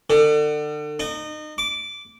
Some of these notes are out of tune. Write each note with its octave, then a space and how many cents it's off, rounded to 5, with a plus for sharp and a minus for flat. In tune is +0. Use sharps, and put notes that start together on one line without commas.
D3 +35
D#4 -30
D6 -10